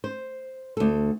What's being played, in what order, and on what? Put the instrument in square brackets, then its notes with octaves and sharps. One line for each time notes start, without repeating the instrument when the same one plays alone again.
[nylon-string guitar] C5
D2 A4